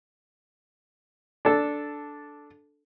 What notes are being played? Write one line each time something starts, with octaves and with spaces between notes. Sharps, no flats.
D4 A4